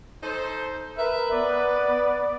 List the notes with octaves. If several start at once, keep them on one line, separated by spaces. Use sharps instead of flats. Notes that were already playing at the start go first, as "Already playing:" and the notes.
D#4 A4 C5
A#4 B4 E5
B3 D5